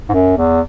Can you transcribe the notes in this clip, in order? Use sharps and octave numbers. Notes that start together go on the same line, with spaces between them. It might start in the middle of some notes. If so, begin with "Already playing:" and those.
G#2
F#2
E2